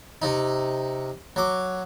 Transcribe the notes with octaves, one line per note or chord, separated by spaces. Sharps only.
C3 D#4
F#3 D6